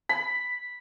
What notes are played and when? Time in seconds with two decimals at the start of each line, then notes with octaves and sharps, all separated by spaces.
0.09 B5